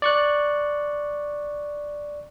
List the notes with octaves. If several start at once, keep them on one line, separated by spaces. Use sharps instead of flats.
D5 C#6 F#6